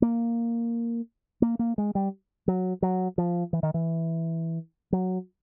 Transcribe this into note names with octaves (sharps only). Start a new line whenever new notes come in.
A#3
A#3
A#3
G#3
G3
F#3
F#3
F3
E3
D#3
E3
F#3